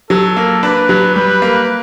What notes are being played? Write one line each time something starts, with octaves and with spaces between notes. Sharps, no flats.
F#3 A4
A#3
D4 B4
F#3
G3 B4
A#3